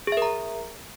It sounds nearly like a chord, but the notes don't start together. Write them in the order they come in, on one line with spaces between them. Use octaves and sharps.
G#4 E5 A#4 A#5